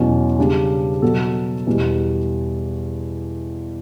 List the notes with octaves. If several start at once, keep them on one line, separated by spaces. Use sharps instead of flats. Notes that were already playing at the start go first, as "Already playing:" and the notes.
Already playing: E2 B2 F#3 C#4
C#3 G3 D4
B2 F#3 B3 F#4 A4
E2 B2 G3